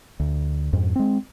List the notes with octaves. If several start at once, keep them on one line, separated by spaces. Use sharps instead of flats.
D2
F2 G#2
G#3 C4